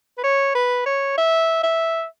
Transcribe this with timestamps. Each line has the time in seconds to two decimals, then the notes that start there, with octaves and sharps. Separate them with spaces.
0.18 B4
0.24 C#5
0.55 B4
0.86 C#5
1.18 E5
1.63 E5